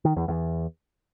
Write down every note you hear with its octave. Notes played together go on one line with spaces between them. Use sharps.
D#3
E2
E2